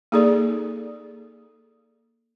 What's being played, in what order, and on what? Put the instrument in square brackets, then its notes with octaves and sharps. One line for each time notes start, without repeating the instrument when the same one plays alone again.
[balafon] A#3 D#4 G#4 A4 D5